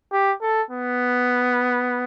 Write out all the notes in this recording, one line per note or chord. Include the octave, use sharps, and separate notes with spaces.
G4
A4
B3